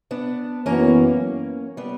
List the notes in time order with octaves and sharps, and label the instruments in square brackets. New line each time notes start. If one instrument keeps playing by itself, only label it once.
[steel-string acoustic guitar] B3 D4
[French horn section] F#2 E3 B3 [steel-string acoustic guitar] A#3 C#4
[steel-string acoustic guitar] G3 B3